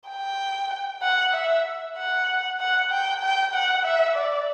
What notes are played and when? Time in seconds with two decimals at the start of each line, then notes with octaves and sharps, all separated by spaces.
0.10 G5
1.03 F#5
1.34 E5
1.98 F#5
2.60 F#5
2.91 G5
3.23 G5
3.53 F#5
3.85 E5
4.16 D5